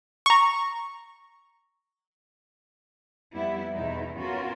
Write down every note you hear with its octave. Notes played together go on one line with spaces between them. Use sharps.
A#5 C#6
F2 G3 B3 E4
E2 B2 E3 D#4 E4
B3 C#4 F4 F#4 A#4